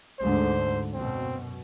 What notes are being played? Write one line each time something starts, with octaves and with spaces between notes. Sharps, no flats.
D2 G#2 D3 C5
F#2 B2 C4